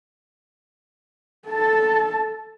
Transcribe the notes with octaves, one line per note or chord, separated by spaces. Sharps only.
A4 A5